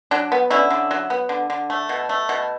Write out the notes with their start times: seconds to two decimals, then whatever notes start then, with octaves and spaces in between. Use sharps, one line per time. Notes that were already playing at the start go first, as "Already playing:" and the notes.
0.11 F#3 D4
0.32 B3
0.50 D3 C#4 E4
0.70 D3
0.91 F#3
1.10 B3
1.29 D3
1.50 D3
1.70 A3
1.89 B2
2.09 A3
2.29 B2